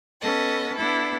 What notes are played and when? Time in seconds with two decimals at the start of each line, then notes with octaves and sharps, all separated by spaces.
0.21 B3 C#4 A4 D#5 A5
0.77 B3 D4 E4 A4